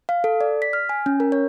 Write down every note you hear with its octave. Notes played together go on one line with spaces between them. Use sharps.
F5
A4
D5
B6
F6
G#5
C#4
A#4
C#5